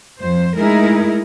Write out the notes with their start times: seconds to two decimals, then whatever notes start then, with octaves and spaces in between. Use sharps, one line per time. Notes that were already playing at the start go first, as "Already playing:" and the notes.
0.20 F2 C5
0.57 G#3 A3 D#4 E4 G#4 A#4